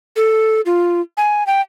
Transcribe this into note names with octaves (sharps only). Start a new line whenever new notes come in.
A4
F4
G#5
G5